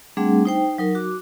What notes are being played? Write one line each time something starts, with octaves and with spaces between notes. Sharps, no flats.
G3 A3 C4 D4 G#4 F#5
D#4 C5 G5
F#3 D#4 A#4
F#4 D6